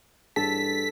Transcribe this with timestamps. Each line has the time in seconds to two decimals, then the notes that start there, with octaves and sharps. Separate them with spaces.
0.36 G2 A4 B6